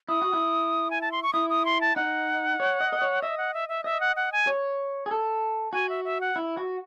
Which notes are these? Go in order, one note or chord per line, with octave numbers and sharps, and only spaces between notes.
E4 D#6
F#4
E4
G#5
A5
C6
C#6
E4 D#6
D#6
C6
A5
D#4 F#5
C#5
D#5
D#5
C#5
D#5 E5
F#5
E5
E5
D#5 E5
F#5
F#5
G#5
C#5
G#4
A4
F#4 G#5
E5
E5
F#5
E4
F#4